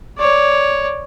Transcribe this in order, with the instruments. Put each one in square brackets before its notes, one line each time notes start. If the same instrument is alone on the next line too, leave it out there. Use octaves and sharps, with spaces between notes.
[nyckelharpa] C#5 D5